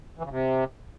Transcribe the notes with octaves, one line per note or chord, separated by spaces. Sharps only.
E3
C#3
C3